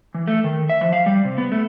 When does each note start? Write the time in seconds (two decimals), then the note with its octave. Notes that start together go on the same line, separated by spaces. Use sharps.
0.14 E3
0.28 A3
0.44 D#3
0.69 E5
0.81 F3
0.93 F5
1.06 G3
1.25 C3
1.38 B3
1.52 A3